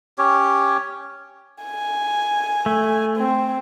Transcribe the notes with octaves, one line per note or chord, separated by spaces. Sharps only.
C#4 G4 C#5
G#5
A3
C4